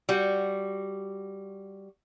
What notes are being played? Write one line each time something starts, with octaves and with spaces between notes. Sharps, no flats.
G3 F#4